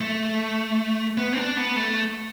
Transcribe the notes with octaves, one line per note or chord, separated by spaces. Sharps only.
A3
B3
C4
D4
B3
A3